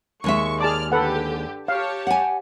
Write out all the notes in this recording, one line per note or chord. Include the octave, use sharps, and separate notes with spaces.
D#2 G#3 E5 C#6
G#4 D5 A5 D6 F6
D3 G4 A4 B4 F#5
G4 C#5 F5 A5
F#5 G#5